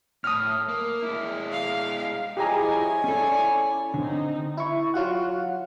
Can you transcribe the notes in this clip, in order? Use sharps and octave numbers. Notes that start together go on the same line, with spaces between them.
A2 D#6 F6
A#3
G#3 E4
F5
F3 E4 G4 G#4 C#5 D#5 G#5 A#5
C#4 E4 A4 D5
D3 C4 D#4
E4 C#6
F#3 F4 F#4 F#5